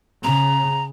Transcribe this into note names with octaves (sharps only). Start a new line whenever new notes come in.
C#3 A#5